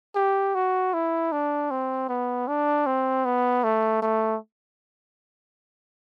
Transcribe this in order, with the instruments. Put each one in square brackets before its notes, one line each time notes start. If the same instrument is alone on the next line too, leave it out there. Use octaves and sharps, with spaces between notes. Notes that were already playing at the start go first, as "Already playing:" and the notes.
[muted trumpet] G4
F#4
E4
D4
C4
B3
D4
C4
B3
A3
A3